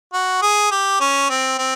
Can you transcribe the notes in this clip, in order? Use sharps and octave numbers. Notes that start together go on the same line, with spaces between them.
F#4
G#4
G4
C#4
C4
C4